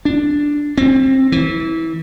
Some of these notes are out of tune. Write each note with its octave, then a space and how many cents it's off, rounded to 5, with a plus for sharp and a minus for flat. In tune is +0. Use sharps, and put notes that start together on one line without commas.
D4 +0
C4 +25
E3 -20